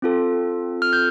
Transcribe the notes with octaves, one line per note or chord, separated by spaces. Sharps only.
C4 F4 A4
F6
G6